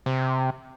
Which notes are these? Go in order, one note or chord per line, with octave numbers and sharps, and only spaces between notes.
C3